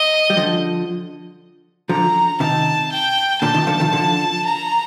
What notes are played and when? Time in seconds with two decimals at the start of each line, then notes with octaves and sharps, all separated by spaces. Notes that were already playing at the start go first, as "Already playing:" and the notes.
Already playing: D#5
0.30 G3
0.37 D3 F3
1.89 D3 F3 A#5
2.40 C3 D#3 A5
2.91 G5
3.42 A#2 D3 A5
3.54 C3 D#3
3.67 D3 F3
3.80 C3 D#3
3.93 D3 F3
4.44 A#5